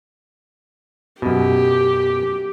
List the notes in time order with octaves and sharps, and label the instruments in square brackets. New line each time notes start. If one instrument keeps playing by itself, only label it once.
[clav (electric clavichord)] F#2 B2 [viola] G4